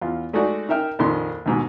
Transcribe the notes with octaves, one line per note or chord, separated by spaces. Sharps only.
E2 F4
G#3 A3 D#4 F#4 D5
D#4 A#4 E5 G5 F6
A#1 F2 D#3 C6
D#2 G#2 B2